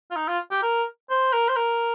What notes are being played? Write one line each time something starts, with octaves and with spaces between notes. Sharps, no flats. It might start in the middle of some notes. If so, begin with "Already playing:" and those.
F4
D#4
F4
G4
A#4
C5
A#4
C5
A#4